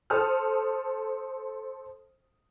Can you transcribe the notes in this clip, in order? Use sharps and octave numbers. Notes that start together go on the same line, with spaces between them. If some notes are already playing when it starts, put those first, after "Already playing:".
A4 C5 A5 D#6 F6